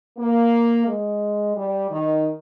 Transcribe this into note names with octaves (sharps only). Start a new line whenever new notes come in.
A#3
G#3
G3
D#3